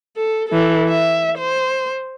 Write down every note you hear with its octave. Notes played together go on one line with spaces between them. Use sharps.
A4
E3 A4
E5
C5